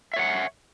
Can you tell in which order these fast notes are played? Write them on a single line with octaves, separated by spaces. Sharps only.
E5 C#5 F#5